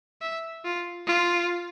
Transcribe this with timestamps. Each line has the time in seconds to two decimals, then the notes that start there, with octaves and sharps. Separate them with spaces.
0.22 E5
0.65 F4
1.07 F4